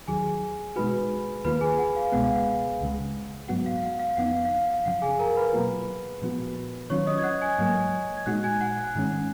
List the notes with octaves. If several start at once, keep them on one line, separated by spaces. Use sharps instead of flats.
D#2 D#3 F#3 G#4 G#5
B2 G#3 D#4 F#4 B4 B5
D#2 D#3 A#3 F4 B4 B5
G#4 G#5
F#5
F5
C#2 B2 G#3 B3 F#5
F5
F#5
C#2 C#3 G#3
G#2 F#3 B3 F#4 F#5
F5
F#5
F5
F2 F3 B3 D#4 F#5
F5
F5
F5
F#2 C#3 F3 F#5
G#4 G#5
A#4 A#5
B4 B5
B2 F#3 A#3 F4
A#2 F3 B3 F#4
D#3 F#3 C#4 F4 C#5 C#6
D#5 D#6
G#6
F#5 F#6
G#5 G#6
G#2 F#3 A#3 G#5 G#6
G#6
A#2 G#3 D#4 F#4 F#5 F#6
G#5 G#6
F#5 F#6
F#5 F#6
G#2 D#3 G#3 C#4